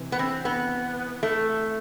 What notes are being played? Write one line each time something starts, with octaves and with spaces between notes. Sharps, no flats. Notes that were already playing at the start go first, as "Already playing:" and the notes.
Already playing: C3 E3
B3
C4
B3
A3